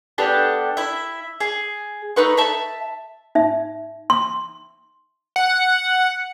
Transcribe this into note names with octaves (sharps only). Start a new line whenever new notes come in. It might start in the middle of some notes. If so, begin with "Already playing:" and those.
B3 D4 G4 A4
E4 E5
G#4
A3 D#4 B4 C#6
E5 A5 B5
D#4 E5
C6
F#5